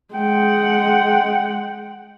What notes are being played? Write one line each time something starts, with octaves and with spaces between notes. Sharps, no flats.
G#3 F#5 G5